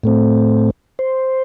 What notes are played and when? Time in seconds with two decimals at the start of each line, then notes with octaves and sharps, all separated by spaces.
0.03 A2 A3 C4
0.99 C5